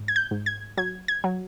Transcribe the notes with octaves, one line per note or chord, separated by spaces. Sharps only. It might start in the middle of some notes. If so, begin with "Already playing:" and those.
Already playing: G#2
G#6
G6
G#2
G#6
F#3 G#6
G#6
F#3